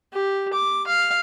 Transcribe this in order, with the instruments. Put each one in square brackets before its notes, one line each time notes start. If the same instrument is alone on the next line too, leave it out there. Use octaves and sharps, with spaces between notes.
[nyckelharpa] G4
D6
F5